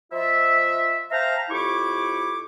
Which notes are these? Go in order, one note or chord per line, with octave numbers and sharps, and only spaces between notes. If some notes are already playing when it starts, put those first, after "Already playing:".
F3 F4 D#5 E5
C5 E5 F5 G5 A5 A#5
F2 E4 G4 C#5 C#6 D6